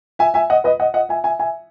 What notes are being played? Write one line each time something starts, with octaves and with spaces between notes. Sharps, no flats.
E5 G#5
E5 G#5
D#5 F#5
B4 D#5
D#5 F#5
D#5 F#5
E5 G#5
E5 G#5
E5 G#5